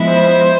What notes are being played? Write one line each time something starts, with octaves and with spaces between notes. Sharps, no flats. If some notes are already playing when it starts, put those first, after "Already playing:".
Already playing: F3 G#3 B3 E4
C5